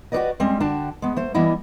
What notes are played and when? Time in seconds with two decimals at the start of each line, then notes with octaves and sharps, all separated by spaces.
0.12 F#4 G4 A4 B4 D5 D#5
0.40 G3 G#3 C4 C#4
0.60 D3 D4 F#4 G5 A5
1.02 G#3 B3
1.17 A3 C5
1.34 E3 G3 B3 E4 D#5